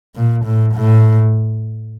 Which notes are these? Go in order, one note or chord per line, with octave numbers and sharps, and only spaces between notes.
A#2
A2
A2